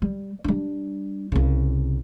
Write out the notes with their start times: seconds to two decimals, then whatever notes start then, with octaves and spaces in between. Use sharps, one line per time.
0.02 G3
0.44 G3 D4
1.32 C2 C#3